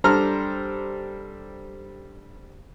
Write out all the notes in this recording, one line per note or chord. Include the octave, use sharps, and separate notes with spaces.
G3 D4 A4 C5 A#5 F6